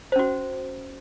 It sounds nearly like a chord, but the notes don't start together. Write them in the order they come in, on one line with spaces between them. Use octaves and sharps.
C5 C#4 F#4